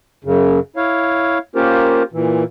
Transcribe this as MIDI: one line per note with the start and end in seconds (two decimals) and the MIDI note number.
0.24 0.59 42
0.24 0.59 49
0.76 1.38 64
0.76 1.38 73
0.76 1.38 77
1.55 2.03 58
1.55 2.03 61
1.55 2.03 65
1.55 2.03 67
1.55 2.03 70
1.55 2.03 72
2.13 2.44 46
2.13 2.44 52